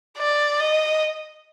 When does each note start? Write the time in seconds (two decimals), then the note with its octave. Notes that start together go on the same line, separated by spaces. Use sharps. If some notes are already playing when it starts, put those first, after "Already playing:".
0.18 D5
0.60 D#5